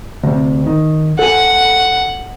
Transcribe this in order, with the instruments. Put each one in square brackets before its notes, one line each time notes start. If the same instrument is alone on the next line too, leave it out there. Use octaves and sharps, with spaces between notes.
[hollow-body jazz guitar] D2 C3
D#3
[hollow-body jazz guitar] A4 G#5 [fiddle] F#5